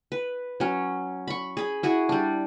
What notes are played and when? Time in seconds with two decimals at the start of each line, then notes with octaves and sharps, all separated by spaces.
0.12 B4
0.60 F#3 C#4
1.27 B5 C#6
1.57 G#4 B5
1.83 E4 F#4 G#4
2.09 G3 D4